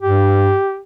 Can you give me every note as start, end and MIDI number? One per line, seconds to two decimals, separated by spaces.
0.02 0.54 43
0.02 0.80 67